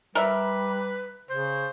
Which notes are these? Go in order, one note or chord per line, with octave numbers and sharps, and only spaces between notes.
G3 A#4 B4 E5
C#3 C5